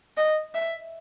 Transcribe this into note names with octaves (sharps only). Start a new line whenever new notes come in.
D#5
E5